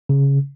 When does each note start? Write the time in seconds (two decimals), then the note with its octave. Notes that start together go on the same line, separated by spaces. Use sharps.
0.09 C#3